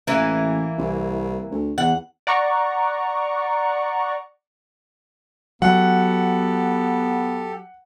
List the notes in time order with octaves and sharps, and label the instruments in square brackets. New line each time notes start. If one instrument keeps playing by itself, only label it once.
[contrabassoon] A1 [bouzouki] E3 A#3
[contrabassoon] C2
D2
[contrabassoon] E2 [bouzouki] F#5
[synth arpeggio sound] D5 F#5 A#5 C#6
[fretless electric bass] F#3 [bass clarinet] B3 [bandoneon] G4 A4 [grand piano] F#5